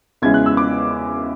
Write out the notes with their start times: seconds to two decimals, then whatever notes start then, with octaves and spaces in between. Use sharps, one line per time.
0.22 E2 C#3 G#3 C#4 E4 G#6
0.34 F#6
0.46 E6
0.57 D6